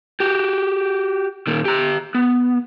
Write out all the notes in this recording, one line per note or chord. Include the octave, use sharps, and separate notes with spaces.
F#4 G4
A#2 D#3
G4 A#5
B3